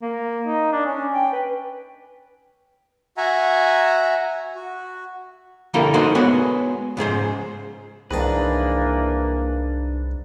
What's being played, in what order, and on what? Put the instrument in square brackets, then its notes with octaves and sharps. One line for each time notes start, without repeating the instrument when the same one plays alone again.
[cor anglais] A#3
D#4
D4
C#4
G5
B4
[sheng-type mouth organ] F#4 E5 F#5 G#5 A#5
F#4
[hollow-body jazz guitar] D3 G3 A#3 E4 A4 A#4
D#4 F#4 A4 A#4 C5
G#3 B3 F#4 B4 C#5
C#2 G#2 G#4 C5
[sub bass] C2 [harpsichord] G#2 D#3 A5 [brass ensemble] E3 A#3 [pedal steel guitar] D4 B4